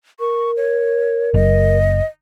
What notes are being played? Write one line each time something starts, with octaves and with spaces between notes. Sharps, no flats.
A#4 C#6
C#5
F#1 D#5